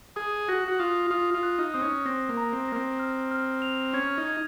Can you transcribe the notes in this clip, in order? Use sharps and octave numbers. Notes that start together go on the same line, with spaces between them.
G#4 D#6
F#4 A#6
F#4
F4 D#6
F4 D#6
F4
F#6
D#4
C4 D#6
C#4
C4 A#6
A#3
A#5
C4
A#3 A#6
C4
F6
F6
F7
C#4 G#6
D#4
G#6